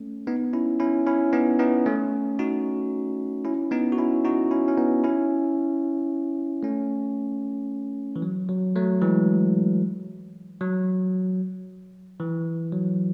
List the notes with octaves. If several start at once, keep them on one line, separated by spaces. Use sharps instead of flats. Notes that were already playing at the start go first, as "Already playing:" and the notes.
Already playing: A3 C#4
B3 D#4
C#4 E4
C#4 E4
C#4 E4
B3 D#4
B3 D#4
A3 C#4
D#4 F#4
C#4 E4
B3 D#4
F#4
C#4 E4
D#4 F#4
C#4 E4
C#4
B3 D#4
C#4 E4
A3 C#4
E3
F#3
F#3
F#3 A3
E3 G#3
F#3
E3
F#3